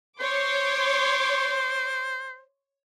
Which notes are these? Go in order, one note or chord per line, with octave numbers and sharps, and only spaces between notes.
C5 C#5 C6 D6